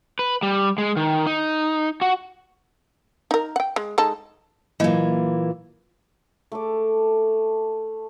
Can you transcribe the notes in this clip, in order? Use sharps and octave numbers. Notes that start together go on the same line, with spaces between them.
B4
G3
G#3
D#3
D#4
F#4
D#4 A#4
F#5 G5
G#3
G#3 D#4 A4
A#2 E3 F#3 A#3 D#5
A3 A4 D6